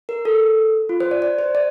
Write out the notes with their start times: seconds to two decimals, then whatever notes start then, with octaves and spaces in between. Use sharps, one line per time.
0.09 A#4
0.25 A4
0.89 F4
1.00 C5
1.11 D5
1.22 D5
1.39 C5
1.55 D5